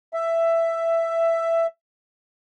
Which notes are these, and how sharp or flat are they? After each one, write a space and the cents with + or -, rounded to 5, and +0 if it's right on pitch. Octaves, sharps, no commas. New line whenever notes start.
E5 +10